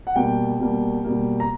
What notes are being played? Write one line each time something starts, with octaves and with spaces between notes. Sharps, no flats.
F#5
B2 G3 A#3 G5
B2 G3 A#3
B2 G3 A#3
A#5